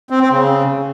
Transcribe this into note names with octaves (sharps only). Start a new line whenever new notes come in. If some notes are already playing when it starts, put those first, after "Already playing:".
C4
C4
C#3